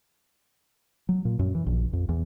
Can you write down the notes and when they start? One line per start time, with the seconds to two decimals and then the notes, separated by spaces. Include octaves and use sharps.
1.09 F#3
1.25 A#2
1.39 F#2
1.55 E3
1.67 A#1
1.93 F2
2.09 E2